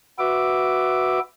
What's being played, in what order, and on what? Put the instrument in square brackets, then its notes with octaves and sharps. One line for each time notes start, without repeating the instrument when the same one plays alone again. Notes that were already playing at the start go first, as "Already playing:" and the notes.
[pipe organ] F#4 B4 E5 D6